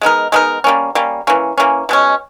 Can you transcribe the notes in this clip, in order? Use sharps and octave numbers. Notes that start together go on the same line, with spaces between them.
G#3 B3 D#4 A#4
G#3 B3 D#4 A#4
G3 A#3 C#4
G3 A#3 C#4
E3 A#3 C#4
E3 A#3 C#4
B2 G#3 C#4